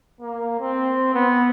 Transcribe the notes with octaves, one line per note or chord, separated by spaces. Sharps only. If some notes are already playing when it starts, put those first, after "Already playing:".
A#3
C4
B3